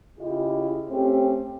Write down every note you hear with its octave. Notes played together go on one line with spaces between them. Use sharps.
C#3 E4 F4 G4 G#4 D#5
A3 C4 C#4 G4